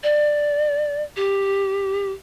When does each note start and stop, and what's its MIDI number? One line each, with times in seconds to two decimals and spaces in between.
0.03 1.02 74
1.16 2.12 67